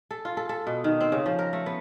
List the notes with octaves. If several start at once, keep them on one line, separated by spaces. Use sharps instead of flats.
A4
F4
A4
A4
B2
D#3
C4
C#3
F3
A#4
A3
B3